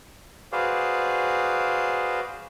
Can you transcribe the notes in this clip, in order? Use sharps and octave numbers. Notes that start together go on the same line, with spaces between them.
F#4 G#4 B4 C5 D5 F5